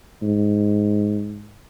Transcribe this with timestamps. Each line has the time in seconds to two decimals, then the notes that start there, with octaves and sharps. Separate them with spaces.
0.22 G#2